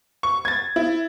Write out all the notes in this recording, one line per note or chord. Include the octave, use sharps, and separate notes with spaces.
C#6
G#6 A6
E4